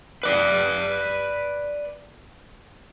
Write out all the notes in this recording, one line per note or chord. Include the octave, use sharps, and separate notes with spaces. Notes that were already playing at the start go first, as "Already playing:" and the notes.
B4 D5